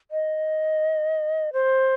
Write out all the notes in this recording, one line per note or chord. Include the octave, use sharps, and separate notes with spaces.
D#5
C5